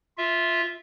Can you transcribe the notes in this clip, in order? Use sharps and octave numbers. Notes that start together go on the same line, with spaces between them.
F4 E5